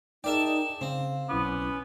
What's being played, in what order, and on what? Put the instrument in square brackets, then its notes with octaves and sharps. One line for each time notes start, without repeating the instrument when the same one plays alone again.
[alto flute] D#4 [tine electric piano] G#4 A#4 G5 [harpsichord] D5 E5 A5
[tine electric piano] C#3 [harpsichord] C4 [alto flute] F5
[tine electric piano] B1 E4 D6 [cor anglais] B3 [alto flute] C#4